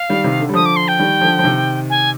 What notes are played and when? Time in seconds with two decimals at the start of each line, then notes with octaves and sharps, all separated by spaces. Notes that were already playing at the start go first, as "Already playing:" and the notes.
Already playing: F5
0.10 D#3 G3
0.24 C3 D#3
0.39 D3
0.49 G3
0.54 D3 F3 D#6
0.66 D6
0.76 C6
0.88 G5
0.99 D#3 G3
1.21 D3 F3
1.39 F3
1.44 C3 D#3
1.90 G#5